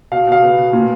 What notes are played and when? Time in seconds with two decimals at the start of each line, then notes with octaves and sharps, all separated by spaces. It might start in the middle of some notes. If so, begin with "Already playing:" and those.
0.11 B2 F5
0.27 B2 F5
0.42 B3
0.58 B2
0.73 A#2